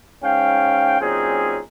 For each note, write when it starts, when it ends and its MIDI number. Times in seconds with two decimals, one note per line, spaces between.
0.22 0.98 44
0.22 0.98 61
0.22 0.98 77
0.22 0.98 79
1.00 1.59 46
1.00 1.59 54
1.00 1.59 60
1.00 1.59 61
1.00 1.59 63
1.00 1.59 68